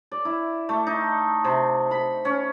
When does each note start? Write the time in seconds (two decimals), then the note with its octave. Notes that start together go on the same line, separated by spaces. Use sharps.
0.11 D5
0.25 E4
0.69 A3
0.87 D#4
1.44 C3
1.91 B5
2.25 C#4